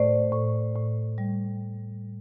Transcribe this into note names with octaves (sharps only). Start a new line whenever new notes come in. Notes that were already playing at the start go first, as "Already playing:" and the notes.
Already playing: A2 A3 C5 D5
A2
A2
G3